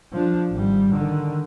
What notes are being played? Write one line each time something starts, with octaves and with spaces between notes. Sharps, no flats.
F3 D4
G#1 G3
D3 D#3